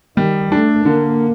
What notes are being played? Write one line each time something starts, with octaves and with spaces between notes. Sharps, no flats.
D#3 G3
A3 D4
D3 A#3